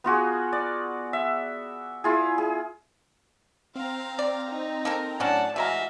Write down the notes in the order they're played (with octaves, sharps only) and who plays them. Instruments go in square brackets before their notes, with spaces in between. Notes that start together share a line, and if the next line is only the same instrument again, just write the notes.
[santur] B3 F4 F#4 G#4
D5
E5
E4 F4 G#4
G#4
[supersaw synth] C4 A#5 [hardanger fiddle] F5
[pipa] D5
[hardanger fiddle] D#4
[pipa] A#3 A4 A#4
[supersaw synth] A2 [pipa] F#3 C#4 D4 [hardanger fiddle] D5 A5 [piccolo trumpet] F#5
[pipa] E3 G#3 A#5 [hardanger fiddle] F#4 F5 [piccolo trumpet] E5